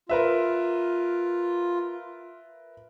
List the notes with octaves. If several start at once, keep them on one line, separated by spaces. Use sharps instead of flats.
F4 A#4 B4 E5